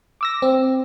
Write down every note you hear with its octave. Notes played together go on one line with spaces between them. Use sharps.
D6 E6 A#6
C4